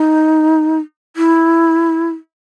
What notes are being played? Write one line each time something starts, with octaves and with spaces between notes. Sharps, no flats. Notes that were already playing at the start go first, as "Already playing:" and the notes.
Already playing: D#4
E4